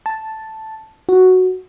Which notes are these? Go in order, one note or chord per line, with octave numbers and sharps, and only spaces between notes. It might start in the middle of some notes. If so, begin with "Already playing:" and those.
A5
F#4